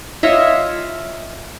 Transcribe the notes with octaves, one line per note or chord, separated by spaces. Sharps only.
F4 C#5 D#5 E5